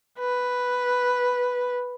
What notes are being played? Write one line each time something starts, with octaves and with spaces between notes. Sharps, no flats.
B4